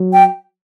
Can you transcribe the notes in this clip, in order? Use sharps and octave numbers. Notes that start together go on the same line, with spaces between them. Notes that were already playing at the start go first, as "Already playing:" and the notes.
Already playing: F#3
G5